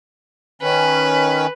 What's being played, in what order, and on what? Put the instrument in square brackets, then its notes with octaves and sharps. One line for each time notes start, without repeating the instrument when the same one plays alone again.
[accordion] D#3 C#4 [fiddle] B4